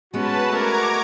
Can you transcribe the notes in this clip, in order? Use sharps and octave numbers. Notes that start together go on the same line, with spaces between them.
G#3 B3 C#4 F#4 B4 A5
A3 A#4 A#5 D6 G#6